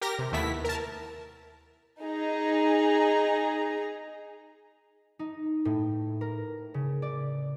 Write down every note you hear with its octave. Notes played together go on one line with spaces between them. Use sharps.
G4 A#4 A#6
C3
D#2 A3 B3 E4 B6
A#4 A5
D#4 G#4 A#5
D#4
A2
A#4
C#3
D5